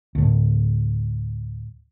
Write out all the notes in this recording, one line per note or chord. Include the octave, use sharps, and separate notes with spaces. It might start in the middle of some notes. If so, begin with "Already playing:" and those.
D2 A2